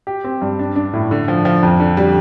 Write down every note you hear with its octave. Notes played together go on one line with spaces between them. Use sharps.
G4
C4
G2
D4
D4
A2
D3
F3
F3
F2
D3
G3